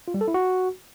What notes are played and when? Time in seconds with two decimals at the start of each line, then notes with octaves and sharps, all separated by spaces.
0.08 F4
0.14 G3
0.21 A4
0.28 E4
0.34 F#4